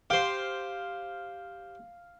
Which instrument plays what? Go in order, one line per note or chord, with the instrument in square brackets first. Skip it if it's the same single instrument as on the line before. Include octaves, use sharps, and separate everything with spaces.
[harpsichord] G4 C5 [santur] F5